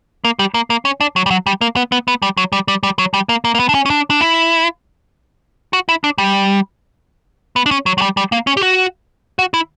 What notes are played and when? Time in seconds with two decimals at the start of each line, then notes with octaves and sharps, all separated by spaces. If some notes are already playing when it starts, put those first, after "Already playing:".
0.25 A#3
0.39 G3
0.54 A#3
0.70 A#3
0.85 C#4
1.01 D4
1.16 F#3
1.26 G3
1.31 F#3
1.47 G3
1.61 A#3
1.76 B3
1.92 B3
2.08 B3
2.22 G3
2.37 F#3
2.52 G3
2.68 G3
2.83 G3
2.99 F#3
3.14 G3
3.29 A#3
3.45 A#3
3.55 A#3
3.60 B3
3.69 D4
3.75 C#4
3.86 C#4
3.90 D4
4.10 D4
4.21 E4
5.73 F#4
5.89 E4
6.04 D4
6.18 G3
7.56 B3
7.66 D4
7.71 C#4
7.86 F#3
7.98 F#3
8.02 G3
8.17 G3
8.32 A#3
8.47 C#4
8.57 G4
8.63 F#4
9.39 F#4
9.54 E4